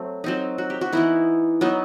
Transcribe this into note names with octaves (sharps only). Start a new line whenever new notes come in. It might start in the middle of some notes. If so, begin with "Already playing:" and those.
Already playing: F#3 A3 C4
F#3 C4 D#4
F#4
G4
F#4
E3 B3 D#4 E4
F#3 B3 D#4